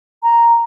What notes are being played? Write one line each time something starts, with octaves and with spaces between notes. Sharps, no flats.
A#5